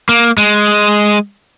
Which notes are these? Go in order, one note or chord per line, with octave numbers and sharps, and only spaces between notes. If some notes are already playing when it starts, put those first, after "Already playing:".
A#3
G#3